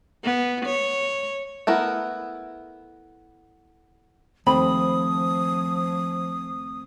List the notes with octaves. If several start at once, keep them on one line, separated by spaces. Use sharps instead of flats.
B3
C#5
A3 B3 E4 A#4
D#2 F3 A3 C4 B5 D#6